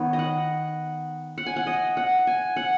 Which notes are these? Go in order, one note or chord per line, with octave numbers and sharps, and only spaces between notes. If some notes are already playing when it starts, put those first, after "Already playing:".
Already playing: D#3 B3 F#4 C#5
D#5
F#5
F#5
G#5
F#5
D#5
F#5
G#5
F#5